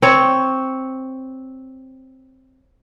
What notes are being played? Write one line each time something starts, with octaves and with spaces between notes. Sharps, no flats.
C4 C#5